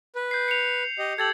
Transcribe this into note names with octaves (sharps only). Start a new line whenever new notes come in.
B4
G6 C7
C#7 F7
G4 D#5
G4 A4 G#6 A6 F#7